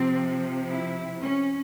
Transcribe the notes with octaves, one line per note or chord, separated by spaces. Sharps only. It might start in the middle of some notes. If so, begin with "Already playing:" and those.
Already playing: C3 F3 C4
E4
C#4